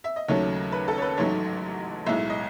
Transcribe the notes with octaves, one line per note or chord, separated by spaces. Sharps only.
E5
D#5
D#2 C#3 F#3 A3 C#5
B4
A4
C#5
B4
A1 G#2 F#3 A3 C#5
B1 A2 G#3 E5
D#5